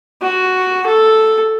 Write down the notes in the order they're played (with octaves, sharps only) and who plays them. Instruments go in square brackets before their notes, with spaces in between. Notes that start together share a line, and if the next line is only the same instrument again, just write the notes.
[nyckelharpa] F#4
A4